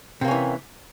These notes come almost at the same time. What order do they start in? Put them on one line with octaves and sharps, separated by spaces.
C3 A#3 C#4 E3